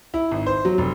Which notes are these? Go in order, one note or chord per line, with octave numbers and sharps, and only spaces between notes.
E4
G#1
C5
F#3
F1